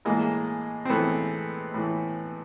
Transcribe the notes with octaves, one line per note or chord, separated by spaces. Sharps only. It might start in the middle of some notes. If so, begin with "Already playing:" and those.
A2 E3 G#3 A#3
C4
A2 E3 A3 B3
A2 E3